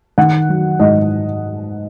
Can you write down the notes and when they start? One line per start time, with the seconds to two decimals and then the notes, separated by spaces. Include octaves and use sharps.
0.18 D#3 F#5
0.49 F#3
0.80 G#2 D#5